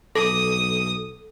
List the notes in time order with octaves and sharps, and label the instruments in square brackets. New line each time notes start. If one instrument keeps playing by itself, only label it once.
[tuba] B1 [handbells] A4 [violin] D#6